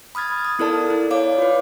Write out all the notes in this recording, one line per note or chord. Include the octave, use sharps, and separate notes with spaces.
B5 D#6 F6 G#6 A6
D#6
B3 E4 A4 A#4 D5 A5
E4
C#5 D5 F5 D6
F4 B4